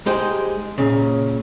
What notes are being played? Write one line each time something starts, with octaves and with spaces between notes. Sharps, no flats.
G#3 D#4 G4 G#4 C5
A#2 C#3